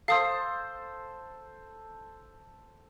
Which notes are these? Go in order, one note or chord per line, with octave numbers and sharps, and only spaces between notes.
A4 C5 F5 D#6